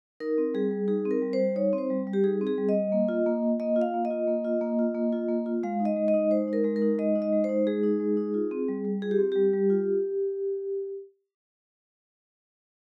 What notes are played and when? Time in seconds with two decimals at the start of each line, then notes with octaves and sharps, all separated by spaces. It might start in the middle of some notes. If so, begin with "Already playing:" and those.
0.20 D#4 A#4
0.38 C4
0.54 G3 G#4
0.71 G3
0.88 D#4 G#4
1.05 C4
1.11 A#4
1.22 G3
1.33 C5
1.39 G3
1.56 D#4 C#5
1.73 C4
1.78 C5
1.90 G3
2.07 G3
2.13 G4
2.24 D#4 G#4
2.41 C4
2.47 G#4
2.58 G3
2.69 D#5
2.75 G3
2.92 A#3
3.09 F4
3.26 A#3
3.43 F4
3.60 A#3 D#5
3.76 F4
3.81 F5
3.94 A#3
4.05 D#5
4.10 F4
4.27 A#3
4.45 F4
4.61 A#3
4.79 F4
4.95 A#3
5.12 F4
5.28 A#3
5.46 F4
5.63 G#3 F5
5.80 D#4
5.85 D#5
5.96 G#3
6.08 D#5
6.14 D#4
6.30 G#3 C5
6.48 D#4 A#4
6.64 G#3
6.76 A#4
6.82 D#4
6.98 G#3 D#5
7.16 D#4
7.22 D#5
7.33 G#3
7.44 D#4 C5
7.67 G#3 G#4
7.83 D#4
8.00 G#3
8.17 D#4
8.34 F4
8.51 C4
8.68 G3
8.85 G3
9.02 F4 G#4
9.11 G4
9.19 C4
9.32 G3 G4
9.53 G3
9.70 F4